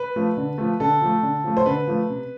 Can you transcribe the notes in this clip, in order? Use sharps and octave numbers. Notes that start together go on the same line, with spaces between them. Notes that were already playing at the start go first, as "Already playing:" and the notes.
Already playing: B4
F3 A3
D3
F3 A3
D3 A4
F3 A3
D3
F3 A3
C5
D3 B4
F3 A3
C3